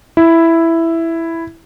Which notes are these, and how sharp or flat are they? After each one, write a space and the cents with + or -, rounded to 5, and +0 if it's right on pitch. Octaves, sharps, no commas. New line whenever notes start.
E4 +5